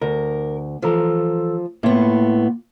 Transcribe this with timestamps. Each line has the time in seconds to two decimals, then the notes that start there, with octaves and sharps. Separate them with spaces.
0.02 D2 A#4
0.82 E3 F3 A4 A#5
1.83 A2 A#3 B3 F4